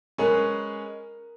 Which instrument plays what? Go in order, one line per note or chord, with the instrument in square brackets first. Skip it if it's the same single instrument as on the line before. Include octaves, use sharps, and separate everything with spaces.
[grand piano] G#3 C#4 G#4 B4 [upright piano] A#4